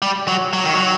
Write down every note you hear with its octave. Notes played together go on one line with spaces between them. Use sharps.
G3
F#3
F#3
D#3
F#3